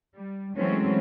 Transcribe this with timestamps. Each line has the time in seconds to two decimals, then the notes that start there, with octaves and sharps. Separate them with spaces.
0.17 G3
0.55 E3 F#3 G#3 A3 C4 C#4